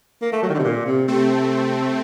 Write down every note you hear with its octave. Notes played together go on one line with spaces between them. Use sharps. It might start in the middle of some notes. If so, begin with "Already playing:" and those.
A#3
A3
F#3
D#3
D3
C3
A#2
C3
C3 A3 C4